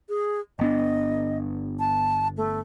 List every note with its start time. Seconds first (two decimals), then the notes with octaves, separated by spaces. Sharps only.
0.09 G#4
0.59 G1 B3 D4 D#5
1.79 A5
2.37 A3